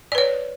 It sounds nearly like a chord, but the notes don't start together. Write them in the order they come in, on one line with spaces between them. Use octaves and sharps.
D5 B4 C#5